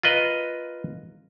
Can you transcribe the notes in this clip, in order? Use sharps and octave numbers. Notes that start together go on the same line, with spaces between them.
F4 A#4 B4 D#5